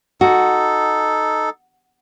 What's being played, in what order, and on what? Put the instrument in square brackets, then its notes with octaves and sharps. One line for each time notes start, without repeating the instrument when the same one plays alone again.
[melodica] D#4 A4 [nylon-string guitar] F#4